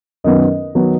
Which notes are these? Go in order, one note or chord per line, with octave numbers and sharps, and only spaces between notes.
F#2 D#3 F#3 B3 D#5
D#3 F#3 B3